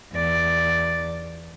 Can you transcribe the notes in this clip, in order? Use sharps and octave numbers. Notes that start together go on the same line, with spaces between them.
E2 D5